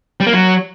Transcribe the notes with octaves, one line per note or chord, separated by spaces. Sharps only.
G3
A#3
F#3